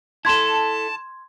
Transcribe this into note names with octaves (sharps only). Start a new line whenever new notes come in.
E4 A4 A5 C6 G#6